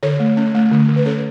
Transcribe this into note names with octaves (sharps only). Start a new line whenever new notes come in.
D3 A4 C#5
A3
C#4
A3
D3
D3
B4
C#4 A4 C#5